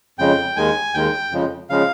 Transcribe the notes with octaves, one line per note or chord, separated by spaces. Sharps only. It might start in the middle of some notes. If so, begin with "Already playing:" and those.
F2 C#3 G#3 G5
D#2 D#3 G#3 G#5
D#2 D#3 G#3 G5
F2 C#3 F3 G#3
C#3 F3 G#3 F5